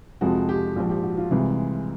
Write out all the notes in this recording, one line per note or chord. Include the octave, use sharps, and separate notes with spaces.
F2 C3 F3 G#3 F#4
G4
A#1 G#2 F3
G4
F#4
F4
C2 C3 E3 G#3